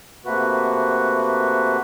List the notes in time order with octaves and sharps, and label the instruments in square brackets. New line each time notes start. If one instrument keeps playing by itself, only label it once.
[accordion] C3 A3 A#3 F#4 B4